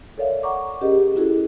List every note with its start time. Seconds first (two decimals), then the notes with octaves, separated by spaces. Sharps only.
0.18 A4 A#4 C#5 D5 E5 F5
0.43 F#5 A#5 C#6 D6
0.81 C#4 G4 G#4 A#4 D#5
1.15 C#4 E4 F#4 G#4 A4